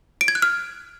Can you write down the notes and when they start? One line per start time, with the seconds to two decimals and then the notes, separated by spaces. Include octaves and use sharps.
0.21 D7
0.28 G#6
0.35 F#6
0.42 F6